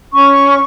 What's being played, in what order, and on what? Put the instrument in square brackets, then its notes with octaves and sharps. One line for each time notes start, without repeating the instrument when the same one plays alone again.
[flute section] C#4 C#6